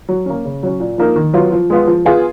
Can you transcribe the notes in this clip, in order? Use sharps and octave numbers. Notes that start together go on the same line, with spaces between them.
F#3
A#3 C#4
C#3
F#3 C#4
A#2
F3 A#3 D#4 A#4
D#3
F#3 B3 F4
F3
G#3 B3 F4
F3
B3 F4 G#4